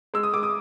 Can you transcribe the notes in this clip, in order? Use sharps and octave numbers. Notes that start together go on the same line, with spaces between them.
G#3 E6
D#6
G#3 D6
D#6